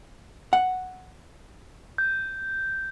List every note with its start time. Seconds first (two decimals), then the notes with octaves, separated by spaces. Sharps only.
0.53 F#5
1.98 G6